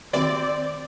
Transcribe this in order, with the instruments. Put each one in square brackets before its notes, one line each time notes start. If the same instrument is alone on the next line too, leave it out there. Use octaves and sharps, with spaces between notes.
[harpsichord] D#2 C3 F#3 [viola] C4 [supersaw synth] D5